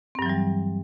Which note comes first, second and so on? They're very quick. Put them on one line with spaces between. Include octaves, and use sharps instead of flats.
C4 G2 F#3 E3 G3